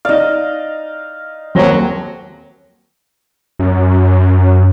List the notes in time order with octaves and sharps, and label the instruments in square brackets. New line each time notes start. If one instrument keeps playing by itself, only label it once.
[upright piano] D#4 D5 [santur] D#5 F5
[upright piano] D#1 A#6 G7 [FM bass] F#3 [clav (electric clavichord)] A#3 C4
[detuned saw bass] F#2